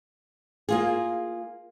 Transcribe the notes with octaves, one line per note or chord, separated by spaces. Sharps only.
A#3 F4 G#4